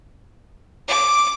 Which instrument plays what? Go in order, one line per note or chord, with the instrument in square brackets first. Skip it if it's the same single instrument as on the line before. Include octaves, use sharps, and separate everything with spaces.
[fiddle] D6